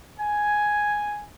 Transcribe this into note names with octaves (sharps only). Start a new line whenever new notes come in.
G#5